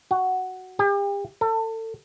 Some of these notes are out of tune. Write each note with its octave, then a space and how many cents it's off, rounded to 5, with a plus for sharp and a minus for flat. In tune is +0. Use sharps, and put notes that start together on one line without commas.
F#4 +5
G4 +40
A4 +30